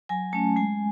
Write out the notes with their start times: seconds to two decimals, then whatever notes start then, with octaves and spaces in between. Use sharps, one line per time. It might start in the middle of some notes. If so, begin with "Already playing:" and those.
0.09 F#3 G#5
0.33 A3 C#4 A5
0.56 G#3 G#5